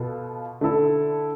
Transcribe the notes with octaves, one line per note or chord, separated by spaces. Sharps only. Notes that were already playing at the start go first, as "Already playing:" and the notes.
Already playing: B2 B3 F4 A4
D3 A3 E4 A4